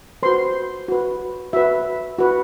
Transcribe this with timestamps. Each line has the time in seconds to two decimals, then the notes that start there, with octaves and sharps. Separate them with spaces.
0.23 F#4 B4 C5 C6
0.88 F#4 B4
1.53 F#4 B4 E5
2.19 F#4 B4